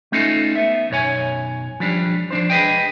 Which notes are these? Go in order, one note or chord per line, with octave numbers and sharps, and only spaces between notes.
A3 C#4 D#4 F4 A4
B3 E5
B1 F#2 C#5 G#5
F3 G3 D4
F3 D4 C5
G#4 B4 D#5 G5